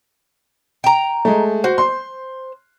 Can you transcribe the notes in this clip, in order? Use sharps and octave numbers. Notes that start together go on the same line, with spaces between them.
G5 A#5
G#3 A3
F#4 C5
C6